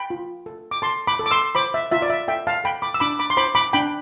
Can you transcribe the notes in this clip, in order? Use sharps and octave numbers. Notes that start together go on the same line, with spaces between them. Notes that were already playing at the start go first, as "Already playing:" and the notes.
Already playing: G5 B5
F4
A4
D6
A4 A5 C6
B5 D6
A4
D6
C6 E6
C5 B5 D6
E5
F4 E5
D5
E5
A4 E5 G5
F5 A5
A4 G5 B5
B5 D6
E6
D4 B5 D6
B5 D6
C6
C5 B5 D6
B5 D6
D4 G5 B5